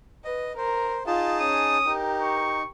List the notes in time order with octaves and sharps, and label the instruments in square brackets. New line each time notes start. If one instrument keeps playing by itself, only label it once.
[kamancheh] B4 [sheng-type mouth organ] D#5
[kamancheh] A#4 [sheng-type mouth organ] C5
[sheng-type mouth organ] D#4 G#4 A5 [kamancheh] F4
[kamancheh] C#4 [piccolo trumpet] D#6
[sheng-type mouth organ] D#4 [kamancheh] G4 A#4
[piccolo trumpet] C#6